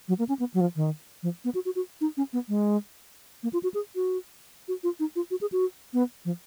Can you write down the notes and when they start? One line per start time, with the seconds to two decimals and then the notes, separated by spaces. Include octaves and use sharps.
0.08 F#3
0.19 A#3
0.29 C#4
0.39 B3
0.54 F#3
0.61 F3
0.76 D#3
1.23 F3
1.45 B3
1.55 F#4
1.65 F#4
1.76 F#4
2.01 D#4
2.17 C#4
2.33 B3
2.49 G#3
3.43 A#3
3.53 F4
3.63 F#4
3.74 G#4
3.95 F#4
4.68 F#4
4.84 F4
5.00 D#4
5.16 F4
5.31 F#4
5.41 G#4
5.52 F#4
5.93 B3
6.25 F3